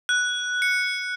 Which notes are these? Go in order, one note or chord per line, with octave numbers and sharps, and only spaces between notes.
F#6
C#7